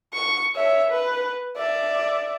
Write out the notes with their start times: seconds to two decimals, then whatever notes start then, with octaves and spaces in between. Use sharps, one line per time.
0.14 C#6
0.55 C#5 E5
0.90 B4
1.57 D5 E5